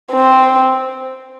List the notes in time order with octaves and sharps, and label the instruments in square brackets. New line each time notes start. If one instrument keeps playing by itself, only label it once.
[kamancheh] C4